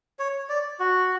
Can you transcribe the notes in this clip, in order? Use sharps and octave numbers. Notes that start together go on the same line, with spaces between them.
C#5
D5
F#4